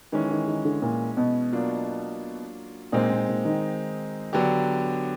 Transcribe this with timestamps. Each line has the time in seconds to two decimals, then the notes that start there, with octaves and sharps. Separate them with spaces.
0.12 D#3 E3 G#3 C#4
0.30 D#3
0.48 D#3
0.65 D3
0.82 A#2
1.17 B2
1.52 F#3 A#3 D4 F4
2.92 A#2 G#3 C4 D#4
3.10 A#2
3.28 A#2
3.45 D#3
4.33 D3 F#3 B3 D4 G4